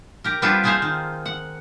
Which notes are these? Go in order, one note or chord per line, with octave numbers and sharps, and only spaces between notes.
G4 A#4
G3 B3 C4 D4 F4 G4
G#3 D#4 G#4 A4 C5 F5
D#3
F#5